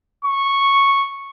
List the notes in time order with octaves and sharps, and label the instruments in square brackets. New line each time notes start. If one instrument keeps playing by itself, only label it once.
[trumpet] C#6